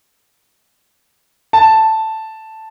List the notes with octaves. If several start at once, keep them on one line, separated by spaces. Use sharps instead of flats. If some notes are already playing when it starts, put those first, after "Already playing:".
A5